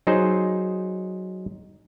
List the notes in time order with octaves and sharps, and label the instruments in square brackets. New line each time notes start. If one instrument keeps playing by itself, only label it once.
[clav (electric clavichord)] F#3 D#4 G#4 C5